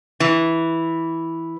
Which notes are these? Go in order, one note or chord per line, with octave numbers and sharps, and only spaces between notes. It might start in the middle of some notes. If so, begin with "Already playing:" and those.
E3